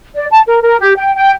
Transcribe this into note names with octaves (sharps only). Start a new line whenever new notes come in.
D5
A5
A#4
A#4
G4
G5
G5